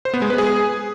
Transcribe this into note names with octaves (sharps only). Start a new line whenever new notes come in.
C5
B3
G#3
B4
G#4